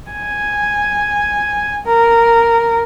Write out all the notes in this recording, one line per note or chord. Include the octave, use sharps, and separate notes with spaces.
G#5
A#4